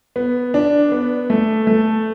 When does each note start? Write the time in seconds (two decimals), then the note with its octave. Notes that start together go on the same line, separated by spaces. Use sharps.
0.16 B3
0.54 D4
0.92 B3
1.30 A3
1.67 A3